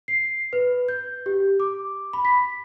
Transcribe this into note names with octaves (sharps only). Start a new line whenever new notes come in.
C7
B4
G6
G4
D6
B5
B6